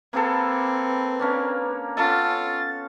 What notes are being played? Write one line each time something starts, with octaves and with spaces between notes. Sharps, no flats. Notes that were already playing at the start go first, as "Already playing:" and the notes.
A#3 C4 G#4 A4 B4
A#3 C#4 D4
B3 C#4 F4 A4 A6